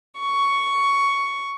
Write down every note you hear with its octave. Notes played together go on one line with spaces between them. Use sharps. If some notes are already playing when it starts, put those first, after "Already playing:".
C#6